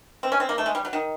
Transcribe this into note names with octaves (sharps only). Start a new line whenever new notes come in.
C4
C#4
C4
A#3
A3
G#3
G3
F#3
D#3